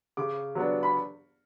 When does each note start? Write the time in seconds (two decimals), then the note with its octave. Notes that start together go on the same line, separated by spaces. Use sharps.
0.17 C#3 D6
0.55 F#3 B3 D4
0.83 B5